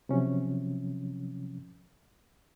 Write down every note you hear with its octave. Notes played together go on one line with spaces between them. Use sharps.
C3 F3 F#3 C#4